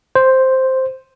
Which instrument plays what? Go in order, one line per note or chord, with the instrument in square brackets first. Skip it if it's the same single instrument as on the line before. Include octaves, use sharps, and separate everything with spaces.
[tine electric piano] C5